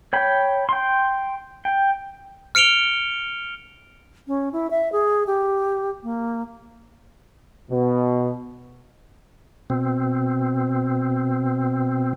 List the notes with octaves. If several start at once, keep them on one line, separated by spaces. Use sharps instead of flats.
C#5 G5 B5
G5 C6
G5
F6 C#7 D7 F7 G7
C#4
E4
E5
G#4
G4
A#3
B2
B2 C4